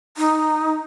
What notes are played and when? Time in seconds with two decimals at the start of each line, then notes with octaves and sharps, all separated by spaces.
0.17 D#4